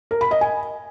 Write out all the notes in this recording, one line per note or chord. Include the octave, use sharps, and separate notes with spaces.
A#4
B5
D#5
G#5